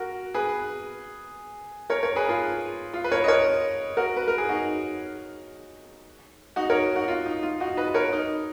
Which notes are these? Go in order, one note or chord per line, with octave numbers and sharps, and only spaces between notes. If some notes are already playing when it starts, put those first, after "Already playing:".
Already playing: F#4 A#4
G#4 B4
A#4 C#5
A#4 C#5
G#4 B4
A#4
F4 G#4
F4
B4
A#4 C#5
D#5
A#4 C#5
F#4 A#4
B4
A#4
G#4
D#4 F#4
D#4 F#4
A#4 C#5
D#4 F#4
F4
D#4
F4
D#4 F#4
B4 D#5
A#4 C#5
D#4